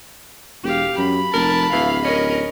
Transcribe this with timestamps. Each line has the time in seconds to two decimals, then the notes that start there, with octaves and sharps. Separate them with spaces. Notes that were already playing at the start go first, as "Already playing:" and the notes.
0.63 E1 G4 F5
0.98 F#2 B5
1.34 F1 A#4 A5
1.73 D1 E3 F5
2.05 C#4 A#4 D#5